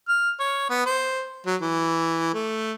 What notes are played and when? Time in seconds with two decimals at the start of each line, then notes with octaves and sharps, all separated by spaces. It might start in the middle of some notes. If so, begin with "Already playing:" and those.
0.08 F6
0.39 C#5
0.69 B3
0.86 C5
1.46 F#3
1.62 E3
2.34 A3